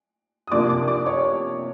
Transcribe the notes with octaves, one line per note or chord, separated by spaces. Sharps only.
D#6
C3 F3 A#3 D4 D5 D6
D5 D6
D5 D6
C#5 C#6